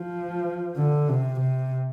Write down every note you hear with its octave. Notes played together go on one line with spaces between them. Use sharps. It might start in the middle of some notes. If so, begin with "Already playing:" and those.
Already playing: F3
D3
C3
C3